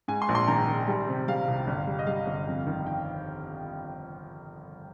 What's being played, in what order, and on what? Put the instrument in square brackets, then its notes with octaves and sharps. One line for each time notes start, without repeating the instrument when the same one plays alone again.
[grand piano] G#2 G#5
C6
A#1
C6
D#3 A#5
D#3
G3
C3
G3 F5
C2
G1
G3
D#5
G3 F5
G1
F2
D#3
G5